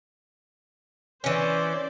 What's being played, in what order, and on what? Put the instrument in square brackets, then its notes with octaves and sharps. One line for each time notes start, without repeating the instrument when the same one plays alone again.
[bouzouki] E3 C#4 [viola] C5 D5